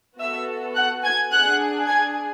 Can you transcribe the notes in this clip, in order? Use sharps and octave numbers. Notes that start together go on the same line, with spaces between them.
B3 F#4 A4 E5 E6
F#5 F#6
G#5 G#6
D4 G#4 F#5 F#6
G#5 G#6